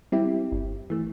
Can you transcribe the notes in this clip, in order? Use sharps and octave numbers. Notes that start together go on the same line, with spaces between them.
G3 C4 E4 G4
G1
E3 A3